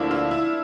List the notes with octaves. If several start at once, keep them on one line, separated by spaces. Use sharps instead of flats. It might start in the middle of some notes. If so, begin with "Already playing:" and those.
Already playing: D2 D3 F3 A#3 D4 E4
F4
E4